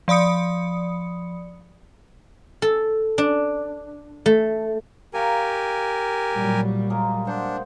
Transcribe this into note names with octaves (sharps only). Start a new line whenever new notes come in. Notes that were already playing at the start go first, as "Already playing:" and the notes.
F3 D5 B5 D#6 C#7
A4
D4
A3
G4 A#4 F5 G#5 A#5 C#6
A#2 F#3 G3
G#3 A#3 A#4
D4 C5 F#5